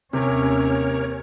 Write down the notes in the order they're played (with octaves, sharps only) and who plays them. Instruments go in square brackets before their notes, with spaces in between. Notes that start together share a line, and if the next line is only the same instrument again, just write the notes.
[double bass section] D#2 C#4 [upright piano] C3 [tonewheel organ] A#4 C#5